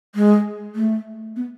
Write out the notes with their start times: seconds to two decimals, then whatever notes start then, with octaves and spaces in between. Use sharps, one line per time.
0.15 G#3
0.75 A3
1.36 B3